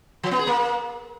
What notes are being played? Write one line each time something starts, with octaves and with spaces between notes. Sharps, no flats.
F3
B3
G#4
A#3